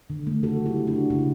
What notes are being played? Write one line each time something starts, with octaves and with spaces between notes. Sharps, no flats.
D3
A3
C#3 F#4 A4
F#3
E4 G4
A3
D4 F#4
C#3
C#3 C#4 E4